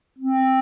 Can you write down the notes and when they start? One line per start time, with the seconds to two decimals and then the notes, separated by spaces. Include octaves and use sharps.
0.19 C4